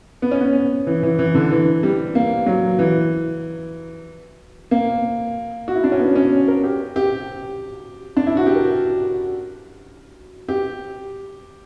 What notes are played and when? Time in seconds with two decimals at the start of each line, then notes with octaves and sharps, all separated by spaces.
0.22 B3
0.31 C#4
0.41 B3
0.87 E3
1.03 E3
1.19 E3
1.35 D3
1.51 E3
1.83 G3
2.15 A#3
2.46 F#3
2.79 E3
4.71 A#3
5.68 F#4
5.75 E4
5.84 D4
5.92 C#4
6.00 B3
6.16 C#4
6.48 A#4
6.64 G4
6.96 G4
8.17 D4
8.27 E4
8.37 F#4
8.46 G4
8.56 A#4
10.49 G4